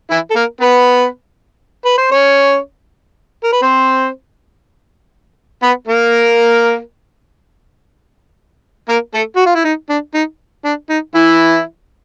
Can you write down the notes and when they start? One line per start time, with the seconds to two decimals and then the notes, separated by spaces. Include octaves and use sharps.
0.10 E3 E4
0.30 A4
0.35 A#3 A#4
0.61 B3 B4
1.85 B4
1.98 C5
2.11 C#4 C#5
3.44 A#4
3.52 B4
3.62 C4 C5
5.63 B3 B4
5.87 A#3 A#4
8.89 A#3 A#4
9.14 A3 A4
9.36 F#4
9.46 F4
9.55 E4
9.65 D#4
9.89 D4
10.14 D#4
10.65 D4
10.90 D#4
11.15 E3 E4